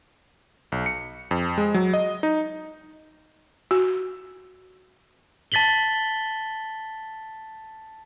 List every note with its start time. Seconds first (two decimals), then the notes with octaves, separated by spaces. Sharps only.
0.72 B1
0.86 C#7
1.31 F2
1.58 G#3
1.74 F#3
1.93 D#5
2.23 D#4
3.71 F#4
5.52 A5 A6 B6 F#7 G7